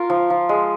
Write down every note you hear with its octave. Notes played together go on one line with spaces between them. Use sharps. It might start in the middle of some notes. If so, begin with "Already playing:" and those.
Already playing: F4 A#4
F3
F3
G#3